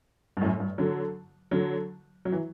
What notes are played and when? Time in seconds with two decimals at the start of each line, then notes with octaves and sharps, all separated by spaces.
0.37 G2
0.41 F#2 A2
0.60 G2
0.78 D3 F#3
1.51 D3 F#3
2.25 F#3
2.32 E3